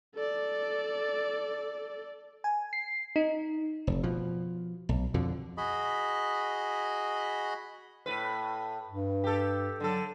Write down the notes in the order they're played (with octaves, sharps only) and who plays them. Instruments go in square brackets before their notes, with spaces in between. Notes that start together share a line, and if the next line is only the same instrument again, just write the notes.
[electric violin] A4 D5
[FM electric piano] G#5
C7
D#4
[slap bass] F1
B2 F3
B1
F2 B2 D3
[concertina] F#4 G#4 D#5 B5
[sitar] A2 B4
[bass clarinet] G2
[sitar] G4 A4
[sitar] D3 A4 [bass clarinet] F#3